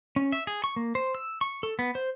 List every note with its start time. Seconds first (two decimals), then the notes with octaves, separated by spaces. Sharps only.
0.16 C#4
0.32 E5
0.47 G#4
0.64 C#6
0.76 A#3
0.95 C5
1.15 E6
1.41 C#6
1.63 A4
1.79 B3
1.95 C5